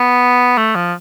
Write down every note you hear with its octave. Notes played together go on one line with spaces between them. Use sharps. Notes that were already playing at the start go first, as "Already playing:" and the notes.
Already playing: B3
A3
F3